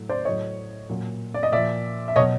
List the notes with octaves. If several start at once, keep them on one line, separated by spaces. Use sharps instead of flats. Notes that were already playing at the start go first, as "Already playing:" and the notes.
Already playing: A2 F#3
C5 D5
A2 F#3 C#5 D#5
A#2 F#3
D5
D#5
A#2 F3 D5 E5
E5
B2 F#3 C#5 D#5